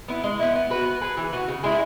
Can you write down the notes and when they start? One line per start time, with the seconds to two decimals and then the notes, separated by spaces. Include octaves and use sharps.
0.08 B3 E4
0.24 G#3
0.39 B3 E4
0.55 B3
0.70 F#4 B4
0.86 B3
1.01 G#4 B4
1.17 E3
1.33 B3 F#4
1.48 C#3
1.63 G#3 E4 G#4